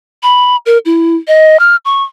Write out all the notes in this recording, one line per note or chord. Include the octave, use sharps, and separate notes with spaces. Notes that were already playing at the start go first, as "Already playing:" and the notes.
B5
A#4
E4
D#5
F6
C#6